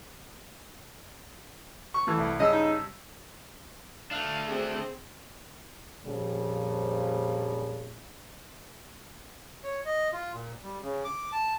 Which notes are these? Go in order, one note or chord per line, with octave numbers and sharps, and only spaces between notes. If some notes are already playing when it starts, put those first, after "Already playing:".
C#6
E3 A3
C2
G2 C#3 D#5 E6
D#4
A3 D4 F5
C4 G#4
F2 A#2 C#3 F3 G3
C#5
D#5
F4
A#2
G3
C#3
D6
A5